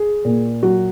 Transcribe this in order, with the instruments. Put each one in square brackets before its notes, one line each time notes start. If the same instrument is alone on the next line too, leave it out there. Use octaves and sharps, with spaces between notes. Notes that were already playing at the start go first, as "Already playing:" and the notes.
Already playing: [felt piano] G#4
A#2
F#3 F#4